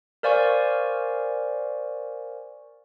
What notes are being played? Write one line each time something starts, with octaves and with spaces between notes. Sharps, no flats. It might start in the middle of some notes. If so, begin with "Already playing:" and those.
A#4 C5 D5 F5 G#5 C#6